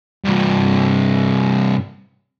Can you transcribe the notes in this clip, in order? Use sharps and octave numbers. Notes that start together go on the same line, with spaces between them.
G2 C3